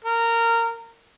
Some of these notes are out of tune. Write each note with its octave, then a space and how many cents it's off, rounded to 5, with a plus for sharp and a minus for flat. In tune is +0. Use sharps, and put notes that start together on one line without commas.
A#4 -15